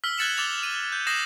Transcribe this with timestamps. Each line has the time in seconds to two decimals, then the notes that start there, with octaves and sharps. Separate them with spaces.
0.04 E6 F6 B6 G7
0.18 F#6 G#6 A6 C#7 E7 F#7
0.37 D6 E6 A6 F7 G7
0.63 D#7
0.92 G6
1.07 D#6 G6 A#6 C7 E7 F#7